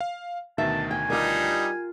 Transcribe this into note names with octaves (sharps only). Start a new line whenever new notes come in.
F5
D2 B2 D#3 E5 A5
G5 G#5
G3 D4 D#4 F4 G4 A#4